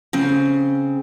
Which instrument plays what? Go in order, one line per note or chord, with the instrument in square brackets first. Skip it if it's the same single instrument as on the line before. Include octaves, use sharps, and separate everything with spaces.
[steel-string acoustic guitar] C#3 C4